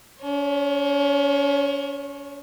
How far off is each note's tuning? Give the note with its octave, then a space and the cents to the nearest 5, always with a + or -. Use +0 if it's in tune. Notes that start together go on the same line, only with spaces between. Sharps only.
C#4 +35 C#5 -25